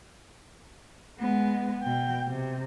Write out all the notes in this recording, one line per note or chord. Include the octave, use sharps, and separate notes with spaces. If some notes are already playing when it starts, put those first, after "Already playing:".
G#3 B3
B2 G5
C3